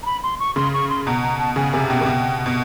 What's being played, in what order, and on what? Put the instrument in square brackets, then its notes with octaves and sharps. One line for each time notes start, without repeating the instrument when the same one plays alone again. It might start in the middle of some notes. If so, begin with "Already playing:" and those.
[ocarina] A#5
B5
C6
C#6
[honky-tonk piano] C#3 [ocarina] C6
[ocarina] C#6
C6
[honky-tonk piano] B2 [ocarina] A#5
[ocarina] A#5
A5
[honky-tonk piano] C#3 [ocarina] G#5
[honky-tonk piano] C3 [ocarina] G#5
[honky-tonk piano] B2 [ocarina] G5
[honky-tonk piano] C3
B2
B2